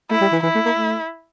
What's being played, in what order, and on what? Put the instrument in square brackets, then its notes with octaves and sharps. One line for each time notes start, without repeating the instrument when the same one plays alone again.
[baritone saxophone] A3 [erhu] E4
[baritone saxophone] G3
E3
[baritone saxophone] E3 [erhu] E4
[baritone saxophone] A3
A#3
A3